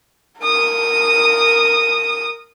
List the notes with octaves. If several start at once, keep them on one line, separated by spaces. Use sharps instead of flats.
A#4 D#6